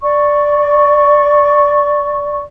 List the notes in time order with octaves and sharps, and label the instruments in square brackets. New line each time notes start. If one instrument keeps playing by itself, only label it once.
[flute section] D5 C#6